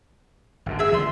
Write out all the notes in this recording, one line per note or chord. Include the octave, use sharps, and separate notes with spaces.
G#1 F#2 D3
G#4 E5
D#2 D3 F3 E5 C6